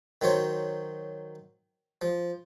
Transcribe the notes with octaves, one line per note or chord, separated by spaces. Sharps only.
D#3 F#3 C5 C#5
F3